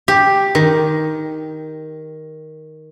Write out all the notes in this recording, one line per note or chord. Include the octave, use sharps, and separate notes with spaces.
G4
D#3